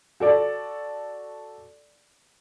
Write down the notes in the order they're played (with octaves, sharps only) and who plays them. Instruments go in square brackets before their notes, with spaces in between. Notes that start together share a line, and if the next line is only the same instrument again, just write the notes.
[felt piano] F#4 A4 D5